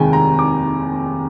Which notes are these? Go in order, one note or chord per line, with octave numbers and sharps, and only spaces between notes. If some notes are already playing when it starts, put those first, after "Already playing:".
Already playing: F1 D#2 D#3 G#3 G5 G#5
A#5
D6